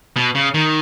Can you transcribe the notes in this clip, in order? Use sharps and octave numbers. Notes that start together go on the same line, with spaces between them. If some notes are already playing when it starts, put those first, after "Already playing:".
B2
C#3
D#3